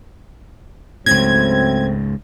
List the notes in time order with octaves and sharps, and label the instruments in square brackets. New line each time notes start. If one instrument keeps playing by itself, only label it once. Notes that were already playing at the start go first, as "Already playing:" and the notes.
[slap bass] C#2 G#2 [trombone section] F#3 A3 C4 [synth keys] G#6